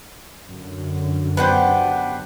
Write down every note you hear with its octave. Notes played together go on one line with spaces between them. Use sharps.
F#2 D3
B3 D4 G4 B4 C5